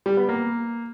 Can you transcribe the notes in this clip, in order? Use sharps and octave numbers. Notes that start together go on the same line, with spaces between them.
G3
B3
A#3